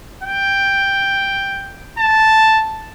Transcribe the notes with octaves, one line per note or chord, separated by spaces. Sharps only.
G5
A5